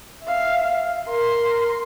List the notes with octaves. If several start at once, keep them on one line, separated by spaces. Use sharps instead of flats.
E5 F5
A#4 C6